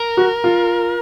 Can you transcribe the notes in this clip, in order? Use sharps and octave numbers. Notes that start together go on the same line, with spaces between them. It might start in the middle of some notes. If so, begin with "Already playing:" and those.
Already playing: A#4
F#4
F4